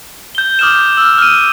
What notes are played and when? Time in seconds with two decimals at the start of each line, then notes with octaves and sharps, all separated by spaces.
0.35 G6 G7
0.59 D6 D#6 F6 G6 E7
0.97 E6 F6
1.18 F6 D#7